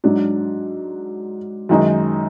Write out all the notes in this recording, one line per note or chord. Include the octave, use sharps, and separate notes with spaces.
G#2 F#3 D4
F#2 D#3 G#3 D#4